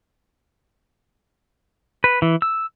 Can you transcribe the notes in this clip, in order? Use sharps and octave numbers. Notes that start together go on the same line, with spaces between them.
B4
E3
E6